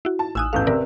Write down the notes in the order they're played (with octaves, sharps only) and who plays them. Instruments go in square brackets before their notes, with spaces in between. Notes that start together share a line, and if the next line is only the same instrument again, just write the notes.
[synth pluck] E4 F#4
[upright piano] A5
[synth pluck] A1 G#5 D#6 [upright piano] E6 F#6
[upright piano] A1 E2 A4 [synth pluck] F5 G6
[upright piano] C3 [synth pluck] A#4 B4 D5